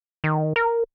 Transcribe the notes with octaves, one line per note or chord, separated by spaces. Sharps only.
D#3
A#4